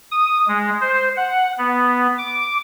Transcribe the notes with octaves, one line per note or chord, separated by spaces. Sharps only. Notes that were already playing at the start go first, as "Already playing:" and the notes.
D#6
G#3
C5
F#5
B3
D6